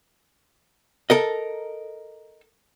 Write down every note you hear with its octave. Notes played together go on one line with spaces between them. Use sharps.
A4 A#4 D#5